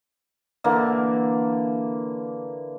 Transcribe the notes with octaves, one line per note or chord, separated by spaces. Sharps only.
D3 E3 A#3